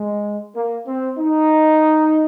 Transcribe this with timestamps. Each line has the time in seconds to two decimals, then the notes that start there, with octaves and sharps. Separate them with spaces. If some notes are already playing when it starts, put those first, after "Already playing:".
Already playing: G#3
0.56 A#3
0.87 C4
1.19 D#4